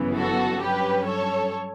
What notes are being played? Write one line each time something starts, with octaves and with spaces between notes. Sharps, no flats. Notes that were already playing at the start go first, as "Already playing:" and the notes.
Already playing: G1 F#2 C#3 E3 B3
F#4 A4
G2 F#3 C#4 G4 B4
A4 C#5